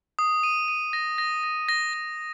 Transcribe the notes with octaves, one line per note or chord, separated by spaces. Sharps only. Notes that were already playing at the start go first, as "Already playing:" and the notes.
D#6
D#7
D#7
A#6
A#6
A#6
A#6
A#6